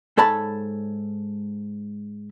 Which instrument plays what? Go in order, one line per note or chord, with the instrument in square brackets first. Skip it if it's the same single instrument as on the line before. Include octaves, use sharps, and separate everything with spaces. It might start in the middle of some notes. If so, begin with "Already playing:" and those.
[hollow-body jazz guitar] G#2 A4 C#5 A5 B5